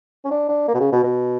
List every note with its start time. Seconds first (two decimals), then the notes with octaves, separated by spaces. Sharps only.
0.25 C#4
0.31 D4
0.49 D4
0.68 A#3
0.74 B2
0.80 C#3
0.92 B2
1.04 B2